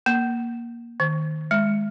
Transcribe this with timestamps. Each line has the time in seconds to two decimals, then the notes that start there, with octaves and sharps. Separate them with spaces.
0.06 A#3
1.00 D#3
1.51 G#3